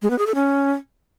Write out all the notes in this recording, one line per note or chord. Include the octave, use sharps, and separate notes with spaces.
G#3
B3
G#4
A4
C#4